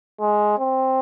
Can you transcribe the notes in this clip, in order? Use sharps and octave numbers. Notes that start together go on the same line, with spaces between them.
G#3
C4